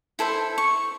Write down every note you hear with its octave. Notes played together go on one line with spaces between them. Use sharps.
E4 A4 C5 E5
C#6